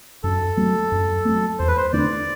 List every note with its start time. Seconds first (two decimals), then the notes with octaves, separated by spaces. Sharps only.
0.23 F#2 A4
0.57 F#3 A3
0.92 F#2
1.25 F#3 A3
1.59 E2 C5
1.68 B4
1.77 C5
1.93 D3 A3 D4 D5